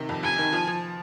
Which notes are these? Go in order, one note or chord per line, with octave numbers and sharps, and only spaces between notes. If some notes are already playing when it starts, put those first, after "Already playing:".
Already playing: C3 D#3
F2
F2 G#5
D#3
F3
F3